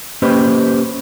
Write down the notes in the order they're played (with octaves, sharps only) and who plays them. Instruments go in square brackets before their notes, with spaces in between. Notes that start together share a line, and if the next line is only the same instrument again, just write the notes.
[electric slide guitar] A#3 C#4 G4 B4 C5 D#5